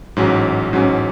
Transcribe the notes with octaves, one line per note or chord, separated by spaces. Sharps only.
A1 G#2 F#3 C#4
A1 G#2 F#3 C#4